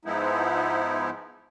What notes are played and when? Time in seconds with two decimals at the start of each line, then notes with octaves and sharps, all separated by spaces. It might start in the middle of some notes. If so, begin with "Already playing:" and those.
0.05 G#2 F3 G#3 B3 D#4 E4